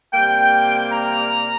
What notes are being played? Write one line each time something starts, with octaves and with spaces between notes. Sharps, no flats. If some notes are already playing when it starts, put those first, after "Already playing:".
C3 G3 A#3 G5
A#5